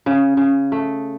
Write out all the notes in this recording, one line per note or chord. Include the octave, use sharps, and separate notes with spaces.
C#3
C#3
A3